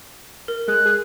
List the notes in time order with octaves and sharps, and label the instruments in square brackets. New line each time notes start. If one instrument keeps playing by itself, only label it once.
[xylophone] A#4
[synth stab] G#3 [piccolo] F#6
[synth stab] G#4